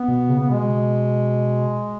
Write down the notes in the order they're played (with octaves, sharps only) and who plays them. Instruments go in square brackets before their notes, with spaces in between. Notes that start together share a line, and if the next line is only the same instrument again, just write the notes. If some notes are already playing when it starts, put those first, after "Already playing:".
Already playing: [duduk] B3
[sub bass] B2
C#3
[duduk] B3
[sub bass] B2 [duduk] G#3